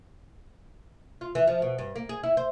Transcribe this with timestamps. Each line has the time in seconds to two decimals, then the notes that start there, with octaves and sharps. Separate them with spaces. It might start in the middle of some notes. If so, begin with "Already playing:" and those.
1.21 F4
1.35 E3
1.47 F3
1.62 B2
1.79 G2
1.96 A#3
2.09 G#4
2.23 E4
2.37 C5